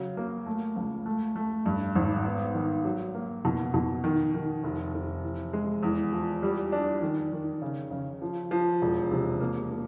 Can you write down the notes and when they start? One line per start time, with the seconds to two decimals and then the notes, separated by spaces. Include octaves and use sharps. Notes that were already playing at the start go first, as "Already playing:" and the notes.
Already playing: C#3 F#3
0.17 A#3
0.46 A3
0.76 C#2
1.06 A3
1.36 A3
1.66 G2
1.95 G#1
2.25 B3
2.54 D#3
2.85 F#3
3.15 A#3
3.45 B2
3.74 B2
4.04 D#3
4.34 D#3
4.63 F1
4.94 F1
5.23 E3
5.53 G#3
5.83 E2
6.13 F3
6.43 G3
6.72 D4
7.02 D#3
7.32 D#3
7.62 C#3
7.91 C#3
8.22 F3
8.51 F3
8.81 E1
9.11 C3
9.41 A#3
9.71 A#3